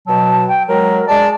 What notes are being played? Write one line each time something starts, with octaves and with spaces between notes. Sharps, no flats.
B2 F#3 A5
G5
F#3 G#3 A#4
G#3 D5 A5